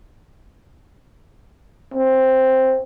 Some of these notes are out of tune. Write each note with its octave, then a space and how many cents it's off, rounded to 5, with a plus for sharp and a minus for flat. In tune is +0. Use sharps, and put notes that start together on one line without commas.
C4 +5